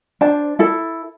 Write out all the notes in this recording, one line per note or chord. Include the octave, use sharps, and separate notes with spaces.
D4 C5 A5
E4 A4 A5